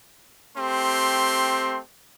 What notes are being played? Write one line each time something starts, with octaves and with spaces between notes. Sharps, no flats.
A3 C4 G4 C6